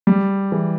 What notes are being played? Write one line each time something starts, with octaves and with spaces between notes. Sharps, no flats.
G3
E3